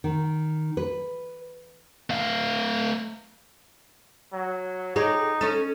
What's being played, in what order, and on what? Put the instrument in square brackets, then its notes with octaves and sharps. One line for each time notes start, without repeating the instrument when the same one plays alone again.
[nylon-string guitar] D#3
B4
[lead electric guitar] A3 F5
[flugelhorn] F#3
[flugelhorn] D#4 [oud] G4 G#4 C#5
[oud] C#4 A4